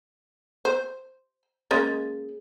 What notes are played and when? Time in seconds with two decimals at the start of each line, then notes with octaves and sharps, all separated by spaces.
0.65 C5
1.71 G#3 A#3 C#4 G#4 A6